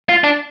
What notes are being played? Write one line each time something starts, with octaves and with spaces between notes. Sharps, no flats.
F4
D4